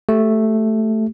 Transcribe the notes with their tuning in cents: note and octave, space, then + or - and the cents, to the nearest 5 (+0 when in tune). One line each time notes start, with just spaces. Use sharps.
A3 +0 G4 +0